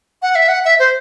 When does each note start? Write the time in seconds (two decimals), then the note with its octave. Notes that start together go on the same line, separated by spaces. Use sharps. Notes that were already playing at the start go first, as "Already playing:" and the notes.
0.22 F#5
0.35 E5
0.48 F#5
0.65 E5
0.79 C5